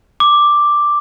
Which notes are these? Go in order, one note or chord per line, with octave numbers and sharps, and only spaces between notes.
D6